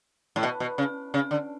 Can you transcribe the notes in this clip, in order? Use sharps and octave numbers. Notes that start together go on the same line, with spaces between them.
A2
B2
B2
C#3
C#3
D3